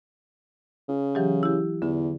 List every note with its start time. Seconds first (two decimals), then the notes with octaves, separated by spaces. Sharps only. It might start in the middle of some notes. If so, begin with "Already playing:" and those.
0.88 C#3
1.15 E3 F#3 G4
1.43 E4 G4
1.82 E2 D3